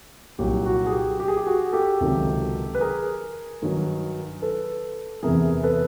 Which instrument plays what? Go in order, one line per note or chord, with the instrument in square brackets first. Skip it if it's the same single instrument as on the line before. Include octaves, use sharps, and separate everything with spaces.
[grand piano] C2 A#2 F#3 G4
F#4
G#4
G4
G4
G#4
G4
F#4 G#4
G4 A4
C#2 C3 D#3 F#3
B4
G#4 A#4
G2 D#3 F#3
A4 B4
E2 C3 E3 G#4 A#4
A4 B4